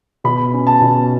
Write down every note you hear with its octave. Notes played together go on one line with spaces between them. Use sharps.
B2 B5
C#4
A5
B2